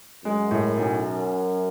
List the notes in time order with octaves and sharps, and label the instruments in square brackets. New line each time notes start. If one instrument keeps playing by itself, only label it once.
[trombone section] F#2 [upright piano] G#3
[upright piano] A2
B1